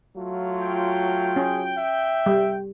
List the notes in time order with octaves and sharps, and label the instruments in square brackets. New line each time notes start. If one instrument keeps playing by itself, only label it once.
[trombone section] F#3 F4 [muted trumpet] A3
[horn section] G5
[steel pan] C#4 [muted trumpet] G#4
[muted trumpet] E5
[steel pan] G3